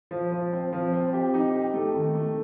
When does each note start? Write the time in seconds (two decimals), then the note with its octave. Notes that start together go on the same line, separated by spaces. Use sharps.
0.11 F3
0.32 F3
0.53 C4
0.73 F3
0.93 C4
1.13 G4
1.34 D#4
1.54 G4
1.74 A3
1.95 D#3
2.15 A3